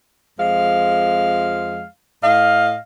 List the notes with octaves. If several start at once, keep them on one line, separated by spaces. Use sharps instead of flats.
F2 F3 G#3 F5
A2 D#5 F5